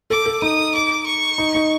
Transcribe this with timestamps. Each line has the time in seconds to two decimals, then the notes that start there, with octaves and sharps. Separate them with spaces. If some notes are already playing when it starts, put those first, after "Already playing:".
0.10 A4 D6
0.26 A4
0.42 D#4 D#6
0.74 D6
1.06 C#6
1.38 D#4
1.55 D#4